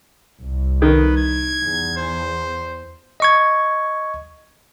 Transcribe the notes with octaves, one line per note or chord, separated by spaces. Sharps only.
C2
D#3 B4
G#6
E2
C5
D#5 C#6 G#6